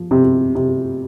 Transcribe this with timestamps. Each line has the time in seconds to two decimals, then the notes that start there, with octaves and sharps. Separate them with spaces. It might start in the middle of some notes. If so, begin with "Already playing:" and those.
Already playing: F3
0.11 C3
0.55 C3